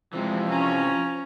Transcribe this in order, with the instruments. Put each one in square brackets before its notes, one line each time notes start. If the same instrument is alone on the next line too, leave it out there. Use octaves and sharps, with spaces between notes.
[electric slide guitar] F2 C3 E3 [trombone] F3 [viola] G#3
[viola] C#4 A#5